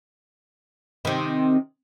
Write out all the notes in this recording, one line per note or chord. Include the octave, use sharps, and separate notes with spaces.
C3 D#3